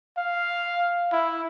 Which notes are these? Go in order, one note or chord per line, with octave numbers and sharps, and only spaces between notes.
F5
E4